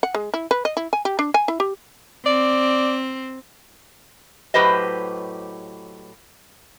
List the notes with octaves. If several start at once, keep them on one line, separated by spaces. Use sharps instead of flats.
F#5
G#3
E4
B4
D#5
E4
G#5
G4
D4
G#5
E4
G4
C4 D5
A2 F#3 G4 B4 C5 D#5